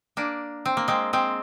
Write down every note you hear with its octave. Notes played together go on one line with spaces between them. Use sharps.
A#3 D4
C4
A#3
G#3 C4
G#3 C4